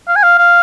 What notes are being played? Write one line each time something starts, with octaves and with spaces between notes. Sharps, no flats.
F5
G#5
F5
F5